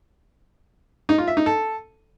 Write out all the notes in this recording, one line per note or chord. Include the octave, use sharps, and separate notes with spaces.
D#4
F4
E5
D#4
A4